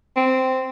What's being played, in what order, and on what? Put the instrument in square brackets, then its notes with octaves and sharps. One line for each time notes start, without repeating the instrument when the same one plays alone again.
[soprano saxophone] C4